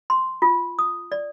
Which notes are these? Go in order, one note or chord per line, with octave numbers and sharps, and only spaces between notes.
C6
F4
D#6
D5